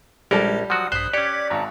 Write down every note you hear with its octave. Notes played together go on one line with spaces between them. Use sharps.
A#1 G3 G#3 C#4 A4 A#4
F3 F#3 F#4 F#5 D#6
A#1 G2 C5 D#6 F#6 B6
C#4 G4 D5 D6 G#6 B6 C#7
G#1 A5 A#5